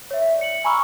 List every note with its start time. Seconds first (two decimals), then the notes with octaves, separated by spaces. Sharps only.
0.11 C#5 E5
0.28 D5
0.41 C#7 F#7
0.64 G#5 A#5 B5 C#6 E6 F6